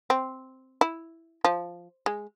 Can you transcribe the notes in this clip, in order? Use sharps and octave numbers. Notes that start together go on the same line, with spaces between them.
C4
E4
F3
G#3